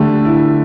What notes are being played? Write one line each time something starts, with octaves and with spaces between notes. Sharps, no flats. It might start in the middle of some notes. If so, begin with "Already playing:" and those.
Already playing: D3 A3 G4
E4